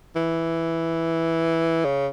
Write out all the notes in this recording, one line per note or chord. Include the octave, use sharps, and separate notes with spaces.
E3
C#3